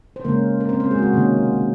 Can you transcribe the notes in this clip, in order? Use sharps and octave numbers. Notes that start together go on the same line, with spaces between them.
C5
C#3 G#3 A#3 C#4 A#4
A#4
C4 C5
C4 C5
G#3 G#4
F#4
G#3 G#4
C3 D#3 A#3 C#4